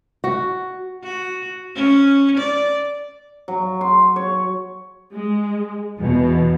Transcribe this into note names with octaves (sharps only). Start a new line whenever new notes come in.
F#4
F#4
C#4
D5
F#3
C6
C#5
G#3
E2 B2